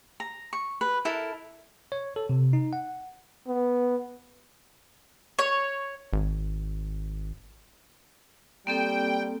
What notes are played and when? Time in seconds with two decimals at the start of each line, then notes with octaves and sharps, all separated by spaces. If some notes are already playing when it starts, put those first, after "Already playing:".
0.20 A#5
0.53 C#6
0.81 B4
1.05 E4 A4 A#4
1.92 C#5
2.16 A4
2.29 C3
2.53 D#4
2.73 F#5
3.48 B3
5.39 C#5
6.13 G#1
8.67 G3 A#3 C4 A4 G5